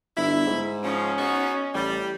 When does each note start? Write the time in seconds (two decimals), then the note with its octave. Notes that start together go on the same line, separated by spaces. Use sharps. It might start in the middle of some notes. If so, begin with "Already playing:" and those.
0.17 G1 E4
0.46 G#2
0.84 C#3 F3 C#4
1.18 B3 D#4 F#4
1.74 A1 G3